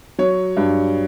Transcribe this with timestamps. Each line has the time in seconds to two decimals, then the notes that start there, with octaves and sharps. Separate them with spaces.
0.18 F#3 C#5
0.57 G2